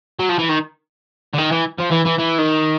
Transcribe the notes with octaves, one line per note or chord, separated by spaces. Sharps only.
F#3
F3
E3
D#3
D3
D#3
E3
F3
E3
E3
E3
D#3